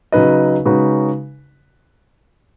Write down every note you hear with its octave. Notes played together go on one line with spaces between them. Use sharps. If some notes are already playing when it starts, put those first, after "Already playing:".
C#3 F#3 D#4 B4 D#5
C#3 G#3 D#4 F#4 B4